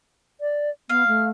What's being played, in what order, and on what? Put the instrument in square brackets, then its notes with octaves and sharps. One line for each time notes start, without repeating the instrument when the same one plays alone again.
[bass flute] D5
[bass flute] B3 [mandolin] F5
[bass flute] A3